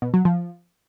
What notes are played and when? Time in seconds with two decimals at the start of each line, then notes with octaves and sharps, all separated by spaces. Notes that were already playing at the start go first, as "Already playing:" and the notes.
0.02 B2
0.14 F#3
0.25 F3